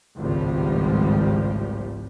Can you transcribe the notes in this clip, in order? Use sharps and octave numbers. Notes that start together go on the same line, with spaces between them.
G#1 C#2 A2 F3 G3